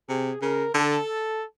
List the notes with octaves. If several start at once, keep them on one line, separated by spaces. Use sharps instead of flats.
C3 G#4
C#3 A#4
D3 A4